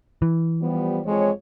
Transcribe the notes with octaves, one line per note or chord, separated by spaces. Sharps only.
E3
F3 G3 B3
F2 G#3 C#5